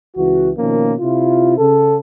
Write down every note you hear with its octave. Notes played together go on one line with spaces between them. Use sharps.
C#2 E3 F#4
B2 D#3 F3 A#3 C#4
C3 E4 F4
C#3 A4